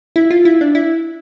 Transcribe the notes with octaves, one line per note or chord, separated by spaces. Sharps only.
E4
F4
E4
D4
E4